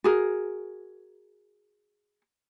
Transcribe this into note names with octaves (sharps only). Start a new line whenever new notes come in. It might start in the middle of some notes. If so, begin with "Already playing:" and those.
F#4 G#4 A#4